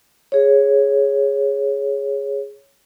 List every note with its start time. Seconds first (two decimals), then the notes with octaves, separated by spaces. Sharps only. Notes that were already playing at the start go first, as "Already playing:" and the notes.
0.32 G#4 C#5